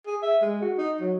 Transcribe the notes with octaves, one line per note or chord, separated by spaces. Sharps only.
G#4
E5
G#3
F#4
D#4
F#3